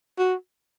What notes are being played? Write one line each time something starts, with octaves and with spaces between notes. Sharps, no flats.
F#4